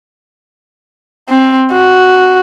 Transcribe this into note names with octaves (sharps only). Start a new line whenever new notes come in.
C4
F#4